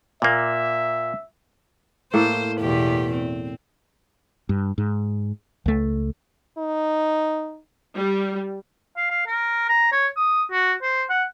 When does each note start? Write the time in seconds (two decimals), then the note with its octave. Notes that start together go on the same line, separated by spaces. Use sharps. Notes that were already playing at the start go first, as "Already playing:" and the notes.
0.22 A#2 A#3 E5
2.14 A2 A#3 A4 C5
2.60 E2 B2 G4
3.13 C4
4.49 G2
4.78 G#2
5.66 C#2 A3
6.58 D#4
7.95 G3
8.97 F5
9.10 F5
9.26 A#4
9.68 A#5
9.92 C#5
10.17 D#6
10.51 F#4
10.82 C5
11.09 F#5